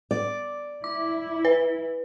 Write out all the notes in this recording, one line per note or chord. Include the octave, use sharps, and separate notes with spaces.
D5
E4 D6
B4